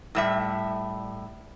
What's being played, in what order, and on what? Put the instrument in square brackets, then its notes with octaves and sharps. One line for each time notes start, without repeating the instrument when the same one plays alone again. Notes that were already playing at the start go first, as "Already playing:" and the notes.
[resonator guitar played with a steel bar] A2 G3 E5